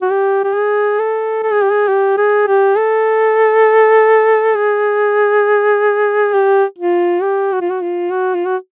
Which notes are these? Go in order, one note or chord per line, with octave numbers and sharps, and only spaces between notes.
F#4
G4
G4
G#4
A4
A4
G#4
G4
G#4
G4
G#4
G4
A4
G#4
G4
F4
G4
F#4
F4
F#4
F4
F#4
F4
F#4